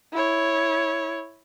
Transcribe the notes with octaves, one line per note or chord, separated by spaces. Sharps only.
E4 C#5